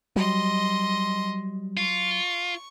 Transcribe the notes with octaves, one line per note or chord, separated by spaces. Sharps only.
F#3 G3 D#5 C6
F4 C#6